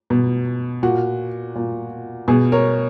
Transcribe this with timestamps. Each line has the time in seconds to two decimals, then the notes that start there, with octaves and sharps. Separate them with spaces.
0.10 B2
0.83 A#2 F#4
1.55 A#2
2.28 B2 G#4
2.52 A#4 C#5